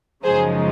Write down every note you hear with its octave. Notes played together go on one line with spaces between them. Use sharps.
F#2 C#3 F3 G#3 D#4 G#4 C5